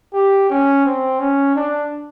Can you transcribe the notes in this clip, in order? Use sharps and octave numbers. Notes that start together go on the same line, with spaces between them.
G4
C#4
C4
C#4
D4